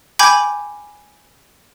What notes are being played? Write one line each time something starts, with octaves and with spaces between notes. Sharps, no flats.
G5 G#5 B5 D6 G6 G#6